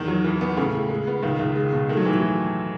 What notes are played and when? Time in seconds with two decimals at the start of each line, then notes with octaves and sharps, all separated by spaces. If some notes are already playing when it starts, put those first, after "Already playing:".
Already playing: E2 D#3
0.08 F#3
0.24 E3
0.41 B3
0.57 A2 C#3
0.74 A2
0.90 G#3
1.07 B3
1.22 C#2 D#3
1.39 C#2
1.55 G#3
1.73 B2
1.89 D#3 A3
1.97 F#3
2.05 A2 E3
2.13 F#3